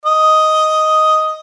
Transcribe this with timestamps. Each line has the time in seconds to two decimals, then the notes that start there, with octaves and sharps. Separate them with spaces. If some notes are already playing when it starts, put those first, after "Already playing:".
0.05 D#5